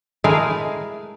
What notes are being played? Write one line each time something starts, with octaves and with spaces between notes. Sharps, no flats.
G#3 A3 E4 A#4 F5 G#5